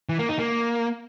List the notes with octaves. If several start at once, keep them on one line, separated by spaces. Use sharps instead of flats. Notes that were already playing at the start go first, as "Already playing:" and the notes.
E3
A#3
D#4
A#3